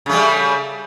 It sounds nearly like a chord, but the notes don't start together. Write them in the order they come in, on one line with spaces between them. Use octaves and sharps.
C#3 A3 G3